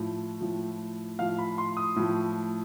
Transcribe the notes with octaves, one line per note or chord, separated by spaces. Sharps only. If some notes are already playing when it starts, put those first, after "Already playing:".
Already playing: A2 F3
A2 F3
A2 F3 F5
B5
C6
D#6
A2 F3